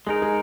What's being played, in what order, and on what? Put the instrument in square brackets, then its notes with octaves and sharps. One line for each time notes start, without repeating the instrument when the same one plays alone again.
[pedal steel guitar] G#3 D#4 A#4 [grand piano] G#4
[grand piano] G#4